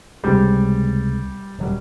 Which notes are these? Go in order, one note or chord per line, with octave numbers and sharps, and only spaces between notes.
C#2 C3 G3 G#3
D#1 F#3 G3